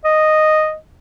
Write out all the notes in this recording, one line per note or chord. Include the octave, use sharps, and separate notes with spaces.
D#5